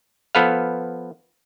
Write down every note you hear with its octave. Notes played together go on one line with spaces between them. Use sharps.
F3 B3 A4 B4 F5